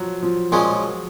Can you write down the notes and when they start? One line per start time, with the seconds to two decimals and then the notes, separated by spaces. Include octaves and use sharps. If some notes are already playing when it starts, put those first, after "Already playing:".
Already playing: F3 F#3
0.23 F3
0.52 A#2 F3 F#3 G#3 C#4